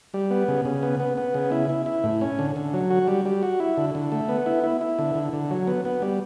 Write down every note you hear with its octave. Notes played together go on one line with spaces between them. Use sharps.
G3
B3
C#3
C#3
B3
B3
B3
C#3
E4
E4
E4
A2
C#4
D3
D3
F#3
F#4
G3
G3
F#4
E4
D3
D3
A3
B3
E4
E4
E4
D3
D3
D3
F#3
B3
B3
G3